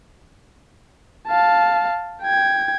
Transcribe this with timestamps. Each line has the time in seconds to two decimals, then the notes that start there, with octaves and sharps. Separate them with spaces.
1.28 F5 A5
2.22 G5 G#6